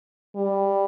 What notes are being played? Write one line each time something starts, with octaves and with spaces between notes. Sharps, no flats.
G3